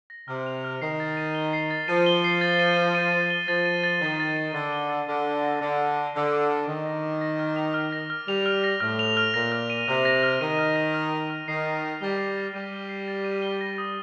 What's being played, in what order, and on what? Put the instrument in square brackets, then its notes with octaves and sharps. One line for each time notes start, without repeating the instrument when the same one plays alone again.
[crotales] A#6
[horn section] C3 [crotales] F6
[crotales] F7
F6
[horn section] D#3 [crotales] C7
[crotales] A6
D#7
G7
C7
A6
[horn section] F3 [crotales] D#7
[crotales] G7
C7
A6
D#7
G7
D#7
A6
G7
[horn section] F3 [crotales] A6
[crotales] D#7
A6
[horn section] D#3 [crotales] G7
[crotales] A6
D#7
[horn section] D3 [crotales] A6
[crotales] G7
A6
[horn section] D3 [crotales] F6
[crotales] D6
A#6
[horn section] D3 [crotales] D6
[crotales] F6
D6
[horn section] D3 [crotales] A#6
[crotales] D6
F6
[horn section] D#3 [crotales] D6
[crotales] A#6
D6
A#6
F6
F7
F6
A#6
F6
[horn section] G3 [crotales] F7
[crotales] F6
A#6
[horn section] A2 [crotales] F6
[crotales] F7
F6
[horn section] A#2 [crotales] A#6
[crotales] F6
D#7
[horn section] C3 [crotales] F6
[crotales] A#6
F6
[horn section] D#3 [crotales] D#7
[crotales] F6
A#6
F6
D#7
F6
[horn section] D#3 [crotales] C7
[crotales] A6
D#7
[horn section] G3 [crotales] G7
[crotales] C7
A6
[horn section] G3 [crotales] D#7
[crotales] G7
C7
A6
D#7
G7
A#6
D#6